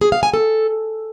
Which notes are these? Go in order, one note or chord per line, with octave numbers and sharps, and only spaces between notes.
G#4
F5
G#5
A4